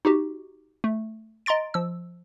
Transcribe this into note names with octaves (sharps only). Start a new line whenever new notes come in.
D#4 F#4 G4
A3
D#5 A#5 C6 A6 D7
F3 E6